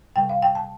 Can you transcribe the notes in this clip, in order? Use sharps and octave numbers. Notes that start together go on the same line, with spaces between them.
C3 G3 G5
F5
G5
A5